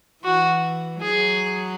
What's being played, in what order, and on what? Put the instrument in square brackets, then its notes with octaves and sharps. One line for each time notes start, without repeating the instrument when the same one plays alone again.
[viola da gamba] E3 [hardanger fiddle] F#4
[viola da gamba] F#3 [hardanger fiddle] G#4